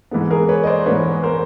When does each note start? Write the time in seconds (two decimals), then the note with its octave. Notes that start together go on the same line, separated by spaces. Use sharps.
0.11 G#2 E3 G#3 B3
0.31 G#4 A#4
0.49 B4 C#5
0.63 D#5
0.67 C5 D5
0.86 G#2 E3 G#3 B3 B4 C#5
1.23 A#4 C5